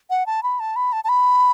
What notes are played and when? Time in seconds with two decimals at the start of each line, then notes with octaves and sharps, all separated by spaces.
0.10 F#5
0.26 A5
0.43 B5
0.60 A5
0.76 B5
0.93 A5
1.04 A5
1.09 B5